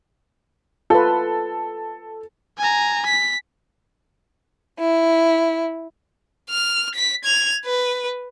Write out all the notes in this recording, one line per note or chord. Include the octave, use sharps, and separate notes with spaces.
F4 A4 B4
G#5 A#5
B6
E4
F6
B6
G#6 F7
B4